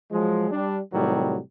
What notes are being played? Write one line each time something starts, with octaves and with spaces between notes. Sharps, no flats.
F3 F#3 G#3
G3 D4
A2 C3 D#3 F#3 G3